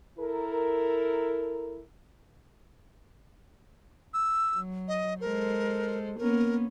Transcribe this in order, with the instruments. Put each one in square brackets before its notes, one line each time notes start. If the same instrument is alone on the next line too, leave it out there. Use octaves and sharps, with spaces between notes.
[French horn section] E4 A4 A#4
[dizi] E6
[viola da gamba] F#3
[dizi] D#5
[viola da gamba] G#3 A4 C5 [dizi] A#4
[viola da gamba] A#3 B3 C#4 [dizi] A#4